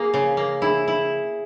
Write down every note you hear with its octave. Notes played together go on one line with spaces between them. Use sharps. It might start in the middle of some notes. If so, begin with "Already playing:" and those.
Already playing: A#3 G#4
C#3
A#3
E4 G#4
E4